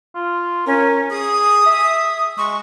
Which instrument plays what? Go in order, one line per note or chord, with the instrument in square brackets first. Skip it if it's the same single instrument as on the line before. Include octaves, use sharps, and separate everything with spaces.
[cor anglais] F4
[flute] C#4 [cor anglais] A#4
[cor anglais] G#4 [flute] D#6
[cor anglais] E5
[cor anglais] G#3 [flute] C#6